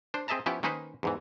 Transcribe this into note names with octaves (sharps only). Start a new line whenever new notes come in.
D4 C5
C4 G#4 D#5 E5 A5 A#5
F3 B3 C#4 E4 G4
D#3 A#3 C#4 D#4 B4 C5
E2 G#2 E3